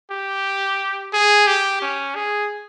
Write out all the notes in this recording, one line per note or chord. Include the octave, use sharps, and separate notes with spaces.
G4
G#4
G4
C#4
G#4